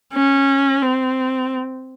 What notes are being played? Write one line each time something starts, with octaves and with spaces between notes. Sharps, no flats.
C#4
C4